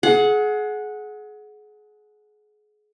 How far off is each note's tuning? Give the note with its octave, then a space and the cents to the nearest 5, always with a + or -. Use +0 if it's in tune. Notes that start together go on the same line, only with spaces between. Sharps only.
G#4 +30 F#5 -10